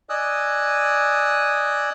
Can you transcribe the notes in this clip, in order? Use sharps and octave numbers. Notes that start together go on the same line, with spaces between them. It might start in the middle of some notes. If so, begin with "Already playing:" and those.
D5 D#5 G#5 D#6 E6 F#6